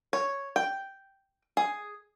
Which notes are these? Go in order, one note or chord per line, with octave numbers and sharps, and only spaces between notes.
C#5
G5
G#4